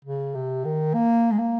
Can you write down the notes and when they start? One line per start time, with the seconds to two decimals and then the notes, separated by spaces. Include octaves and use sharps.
0.05 C#3
0.35 C3
0.65 D#3
0.94 A#3
1.32 G#3
1.39 A#3